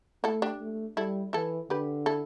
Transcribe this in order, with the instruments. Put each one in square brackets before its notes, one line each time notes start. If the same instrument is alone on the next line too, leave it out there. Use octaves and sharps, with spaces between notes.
[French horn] A3 [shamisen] E4 A4
[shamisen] D4 G4
[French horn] A3
[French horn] G3 [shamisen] E4 A4
[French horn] E3 [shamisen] E4 A4
[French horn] D3 [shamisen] G4 B4
[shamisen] E4 A4